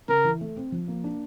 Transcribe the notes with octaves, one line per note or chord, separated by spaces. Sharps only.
C#3 A#4
E3
A3
C4
F3
A#3
D4